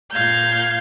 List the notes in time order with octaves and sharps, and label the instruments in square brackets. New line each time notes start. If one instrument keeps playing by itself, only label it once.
[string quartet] A#2 F5 G6 G#6